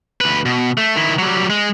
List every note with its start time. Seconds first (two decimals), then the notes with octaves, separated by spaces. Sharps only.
0.21 D2 B4
0.46 B2
0.78 A3
0.96 D#3 E4
1.18 F#3 G3
1.50 G#3